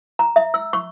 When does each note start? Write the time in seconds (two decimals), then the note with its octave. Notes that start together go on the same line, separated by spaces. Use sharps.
0.19 A#5
0.36 E5
0.54 E6
0.73 C#6